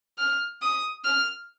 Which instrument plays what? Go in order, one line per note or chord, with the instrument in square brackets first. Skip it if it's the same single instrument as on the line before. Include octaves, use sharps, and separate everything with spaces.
[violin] F6
D#6
F6